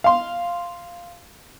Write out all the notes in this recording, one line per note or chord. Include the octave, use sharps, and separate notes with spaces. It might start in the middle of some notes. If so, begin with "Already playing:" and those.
F5 C6